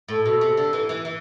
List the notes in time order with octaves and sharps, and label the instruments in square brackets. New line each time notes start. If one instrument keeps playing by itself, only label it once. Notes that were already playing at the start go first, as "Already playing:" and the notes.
[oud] A2 [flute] A4
[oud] B2 [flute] A4
[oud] C3
D3
E3
E3
E3